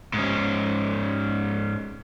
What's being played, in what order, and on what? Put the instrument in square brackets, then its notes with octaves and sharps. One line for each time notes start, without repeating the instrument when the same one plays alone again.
[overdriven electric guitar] G#2 C#4